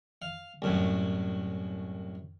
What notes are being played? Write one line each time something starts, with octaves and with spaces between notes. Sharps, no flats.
F5
C2 F#2 A2